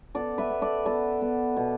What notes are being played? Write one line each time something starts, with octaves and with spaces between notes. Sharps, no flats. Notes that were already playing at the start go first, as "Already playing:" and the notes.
B3 A4 D5
B4 E5
B3
A4 D5
B3 A4 D5
B3
B2